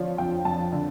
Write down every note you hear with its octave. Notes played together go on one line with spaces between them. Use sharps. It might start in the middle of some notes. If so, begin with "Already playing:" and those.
Already playing: F2 D3 F3 C#5 D5
F2 G5
F2 A5
D3